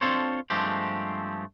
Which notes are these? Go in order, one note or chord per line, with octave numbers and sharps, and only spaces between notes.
C4 D4 F4 A4 C5 C#5
G2 F3 G#3 A3 C4 G4